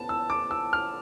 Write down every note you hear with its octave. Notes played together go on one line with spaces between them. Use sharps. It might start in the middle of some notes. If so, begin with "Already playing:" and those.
Already playing: B3 A5
E6
D6
E6
F6